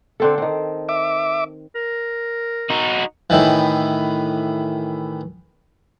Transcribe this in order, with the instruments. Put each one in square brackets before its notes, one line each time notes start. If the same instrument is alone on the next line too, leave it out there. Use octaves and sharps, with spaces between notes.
[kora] D3 C4 A4
D#3 C4
[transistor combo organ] E5 D6
[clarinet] A#4
[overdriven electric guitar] D#4 F#4
[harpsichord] A2 D#3 E3